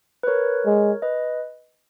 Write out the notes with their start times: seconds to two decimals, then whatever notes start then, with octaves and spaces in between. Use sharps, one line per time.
0.23 B4
0.27 A#4 C#5
0.66 G#3
1.02 B4 D#5